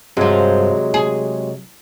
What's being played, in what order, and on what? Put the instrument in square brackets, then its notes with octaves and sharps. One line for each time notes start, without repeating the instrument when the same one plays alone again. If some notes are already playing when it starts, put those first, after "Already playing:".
[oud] G2 F3 [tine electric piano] C3 F#3 G#3
[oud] G#4